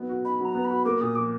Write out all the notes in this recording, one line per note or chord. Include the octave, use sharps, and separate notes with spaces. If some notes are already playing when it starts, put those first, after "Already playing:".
Already playing: F#3 B3 D#4
F#4
D#4 B5
F#3
A#5
B3
B5
F#4
A#3 D6
A#2 D#6
F3 D6